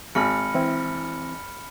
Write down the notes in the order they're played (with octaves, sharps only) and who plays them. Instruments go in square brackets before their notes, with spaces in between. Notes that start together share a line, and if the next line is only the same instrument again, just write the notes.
[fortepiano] G#1 [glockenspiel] B5 F6 C#7
[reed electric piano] E3 C4 E4